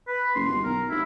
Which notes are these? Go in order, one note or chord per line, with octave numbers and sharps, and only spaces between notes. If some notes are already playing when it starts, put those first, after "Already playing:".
B4
F#1 C6
G1
B1 A#4
F1 E4